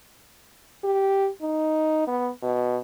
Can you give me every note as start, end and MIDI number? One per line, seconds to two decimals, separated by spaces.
0.84 1.29 67
1.42 2.04 63
2.07 2.29 59
2.43 2.78 47